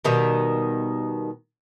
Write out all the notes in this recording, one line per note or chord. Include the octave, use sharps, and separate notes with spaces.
B2 D#3 G3